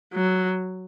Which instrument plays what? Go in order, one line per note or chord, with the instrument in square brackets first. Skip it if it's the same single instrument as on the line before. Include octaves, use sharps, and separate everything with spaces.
[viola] F#3